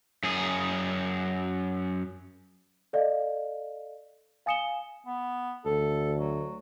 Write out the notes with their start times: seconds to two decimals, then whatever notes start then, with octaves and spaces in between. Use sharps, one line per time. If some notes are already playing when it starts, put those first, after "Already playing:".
0.23 F#2 G#4
2.93 A4 D5 D#5 F5
4.46 F5 G#5 D#6 C#7 E7 G7
5.06 B3
5.66 D2 A4
6.17 F#3